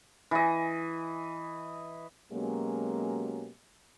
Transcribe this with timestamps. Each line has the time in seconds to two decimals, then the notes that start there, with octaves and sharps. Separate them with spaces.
0.31 E3 D#5
2.32 B2 F#3 G#3 A#3 C#4 G4